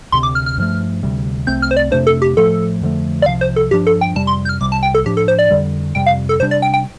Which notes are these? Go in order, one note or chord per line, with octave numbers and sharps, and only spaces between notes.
D2 C3 G3 C4 C6
D6
F6
F6
G2 F3 A3
D2 C3 G3
C2 C3 A3 C4 G6
F6
C5
D5
F2 C3 A3 D4 C5
A4
G4
A2 F3 A3 A4
F2 D3 F3 A3
D5
C2 C3 F3 F5
C5
A4
G2 F3 D4 G4
A4
G5
F2 C3 G3 A5
C6
G6
F6
C2 C3 G3 D6
A5
G5
A4
A2 F3 D4 G4
A4
C5
D5
F2 D3 G3
F2 C3 G3 G5
F5
A4
C3 G3 D4 C5
D5
G5
G5